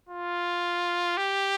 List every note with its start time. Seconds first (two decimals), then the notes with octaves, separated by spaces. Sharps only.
0.09 F4
1.17 G4